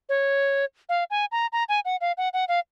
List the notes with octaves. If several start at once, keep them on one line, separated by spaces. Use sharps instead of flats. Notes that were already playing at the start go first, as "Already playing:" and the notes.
C#5
F5
G#5
A#5
A#5
G#5
F#5
F5
F#5
F#5
F5